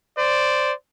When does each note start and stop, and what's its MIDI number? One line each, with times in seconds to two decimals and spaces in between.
0.17 0.72 72
0.17 0.72 74